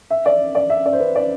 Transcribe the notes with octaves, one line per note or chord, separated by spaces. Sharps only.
E5
D5
D5
E5
D5
C5
B4
D5